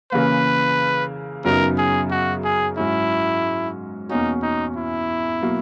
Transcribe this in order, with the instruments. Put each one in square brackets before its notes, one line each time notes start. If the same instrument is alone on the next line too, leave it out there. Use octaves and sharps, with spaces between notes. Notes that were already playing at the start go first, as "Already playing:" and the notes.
[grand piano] C#3 E3 A#3 [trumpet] B4
[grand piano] F#2 C#3 F#3 B3 D#4 [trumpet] A#4
[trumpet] G#4
F#4
G#4
[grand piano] G#2 F#3 C#4 [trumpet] E4
[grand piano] E2 B2 A#3 C#4 F#4 [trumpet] D#4
[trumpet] D#4
E4
[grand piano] B2 F#3 A#3